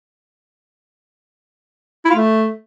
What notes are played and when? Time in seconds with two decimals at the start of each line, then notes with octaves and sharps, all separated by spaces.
2.05 E4
2.10 F4
2.15 A3